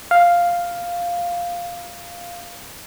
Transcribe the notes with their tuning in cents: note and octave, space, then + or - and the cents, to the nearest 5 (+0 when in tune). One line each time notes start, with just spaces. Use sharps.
F5 +0